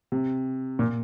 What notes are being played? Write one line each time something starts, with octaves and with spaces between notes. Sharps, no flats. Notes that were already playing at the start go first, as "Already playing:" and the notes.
C3
A#2